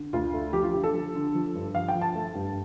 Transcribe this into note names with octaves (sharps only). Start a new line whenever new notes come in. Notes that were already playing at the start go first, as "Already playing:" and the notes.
Already playing: D3
D2 F4
A3
F3 G4
F4
D3 G4
A4
F3
D3
F3
G2
F3 F5
G5
F3
A5
A3
G2